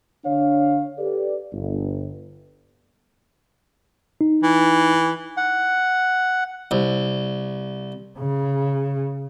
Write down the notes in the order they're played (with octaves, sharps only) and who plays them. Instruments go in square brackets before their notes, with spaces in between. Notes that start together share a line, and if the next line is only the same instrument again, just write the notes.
[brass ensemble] D3 D4 C#5 F5
G4 A4 B4 D5
G1
[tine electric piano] D#4
[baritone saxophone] E3
[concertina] F#5
[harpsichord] C2
[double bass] C#3